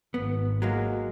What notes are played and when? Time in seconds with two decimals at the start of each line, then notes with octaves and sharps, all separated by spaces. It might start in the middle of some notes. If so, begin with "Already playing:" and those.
0.14 G#1 B3
0.62 F#3 G#3 A#3